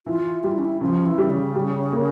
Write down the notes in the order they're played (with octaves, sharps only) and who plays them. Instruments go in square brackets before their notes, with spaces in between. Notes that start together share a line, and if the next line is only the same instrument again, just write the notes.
[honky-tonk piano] E3 [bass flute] F4
[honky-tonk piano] G3 [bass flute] F4
[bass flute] E4
C#4
E4
[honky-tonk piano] C#3 [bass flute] F3
[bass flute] E3
[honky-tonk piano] G3
[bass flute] C#3
[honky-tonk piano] G3
A#3